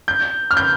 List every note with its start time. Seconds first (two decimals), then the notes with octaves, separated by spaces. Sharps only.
0.08 G6
0.51 F6
0.57 G6